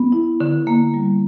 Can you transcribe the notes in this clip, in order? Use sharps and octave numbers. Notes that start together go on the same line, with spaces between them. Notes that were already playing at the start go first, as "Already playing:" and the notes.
Already playing: B3
E4
D3
A#3
G3